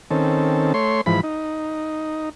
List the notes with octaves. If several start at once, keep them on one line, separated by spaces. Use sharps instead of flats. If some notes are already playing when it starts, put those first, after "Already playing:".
D#3 C4 C#4 A4
A3 C#5 C6
G#2 E3 F3 B5
D#4